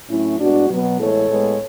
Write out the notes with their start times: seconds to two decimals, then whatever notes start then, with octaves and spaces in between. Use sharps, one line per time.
0.09 A2 F#3 A3 C#4 E4
0.39 A2 G#3 B3 D4 F#4
0.70 B2 F#3 B3
0.99 A2 E3 G#3 B3 A4 C#5
1.29 A2 G#3 B3